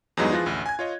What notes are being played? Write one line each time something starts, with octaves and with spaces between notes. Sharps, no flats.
E2 G2 F#3 G#3 B3 D#4
E3 F3 F4 G#4 F#6 A#6
A1 D2
G#5 G#6
F4 C#5 D#5